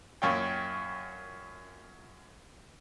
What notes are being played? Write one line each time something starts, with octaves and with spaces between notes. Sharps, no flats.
F#2 A#2 C#5 G5